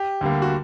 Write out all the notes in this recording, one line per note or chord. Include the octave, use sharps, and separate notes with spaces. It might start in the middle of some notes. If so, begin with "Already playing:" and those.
Already playing: G4
D2 D3 G3 A#3
F#4